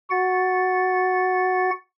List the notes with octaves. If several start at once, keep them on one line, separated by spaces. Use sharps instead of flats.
F#4 F#5 A6